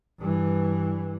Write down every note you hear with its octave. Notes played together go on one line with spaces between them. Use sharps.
G2 E3